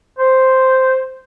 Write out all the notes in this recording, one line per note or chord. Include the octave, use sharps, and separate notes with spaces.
C5